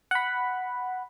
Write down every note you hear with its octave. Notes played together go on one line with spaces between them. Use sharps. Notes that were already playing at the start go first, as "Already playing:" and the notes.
F#5 B5